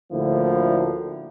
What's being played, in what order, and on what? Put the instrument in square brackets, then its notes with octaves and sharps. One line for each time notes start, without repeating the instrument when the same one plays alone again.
[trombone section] D2 A2 D3 F3 A#3 E4